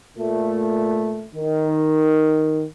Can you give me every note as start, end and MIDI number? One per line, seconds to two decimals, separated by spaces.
0.18 1.26 46
0.18 1.26 57
1.34 2.65 51